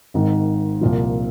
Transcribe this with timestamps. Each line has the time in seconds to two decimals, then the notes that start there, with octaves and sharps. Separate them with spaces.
0.14 G#1 G#2 D#3
0.81 C2 A#2 F3